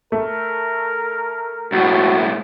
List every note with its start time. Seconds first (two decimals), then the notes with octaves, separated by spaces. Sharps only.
0.12 A3 A#4
1.72 B1 A2 F#4